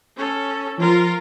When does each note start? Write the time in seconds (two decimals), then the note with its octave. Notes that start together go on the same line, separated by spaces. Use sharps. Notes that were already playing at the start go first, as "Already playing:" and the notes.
0.17 C#4 A4
0.79 F3 F4 A#4